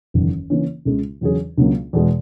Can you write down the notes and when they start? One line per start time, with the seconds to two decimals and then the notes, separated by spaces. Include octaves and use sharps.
0.14 F#1 E2 D#3
0.50 C#3 E3 A#3 C#4
0.85 C#2 C#3 G#3
1.21 E2 C#3 F#3 C#4 G#4
1.58 C#2 C#3 F#3 A#3
1.93 E2 B2 G#3